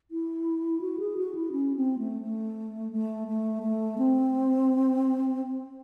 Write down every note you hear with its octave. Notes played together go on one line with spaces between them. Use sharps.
E4
F#4
G#4
F#4
E4
C#4
C4
A3
A3
A3
A3
A3
C4